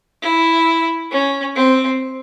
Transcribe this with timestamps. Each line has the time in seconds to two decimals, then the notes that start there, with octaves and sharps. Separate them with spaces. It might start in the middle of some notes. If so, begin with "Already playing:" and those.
0.22 E4
1.11 C#4
1.56 C4